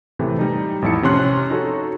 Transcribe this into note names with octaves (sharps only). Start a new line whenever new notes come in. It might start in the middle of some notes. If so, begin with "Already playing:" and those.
A2 C3 E3 A3
G3 D#4
A1 F2 E4 A5 C#7
C3 F3 C#4 C6 F#6
D#4 F#4 A4 C#5